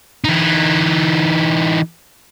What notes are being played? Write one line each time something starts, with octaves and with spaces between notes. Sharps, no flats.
E3 D#4